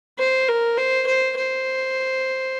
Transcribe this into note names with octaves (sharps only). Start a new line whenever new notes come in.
C5
A#4
C5
C5
C5